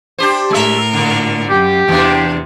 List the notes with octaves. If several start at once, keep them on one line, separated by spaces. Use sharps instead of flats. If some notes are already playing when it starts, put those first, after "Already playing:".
D4 G4 C5
A2 G#3 A#4 E5
A#2 D3
F#2 G4
E2 C3 E3 D4